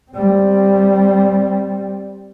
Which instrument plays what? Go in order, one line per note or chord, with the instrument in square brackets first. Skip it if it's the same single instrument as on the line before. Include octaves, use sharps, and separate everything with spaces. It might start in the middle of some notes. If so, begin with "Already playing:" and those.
[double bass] G3 C4